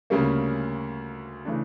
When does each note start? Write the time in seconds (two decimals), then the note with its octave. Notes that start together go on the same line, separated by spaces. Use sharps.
0.10 D2 C#3 G3 A#3 C#4
1.45 C#3 E3 A3 D4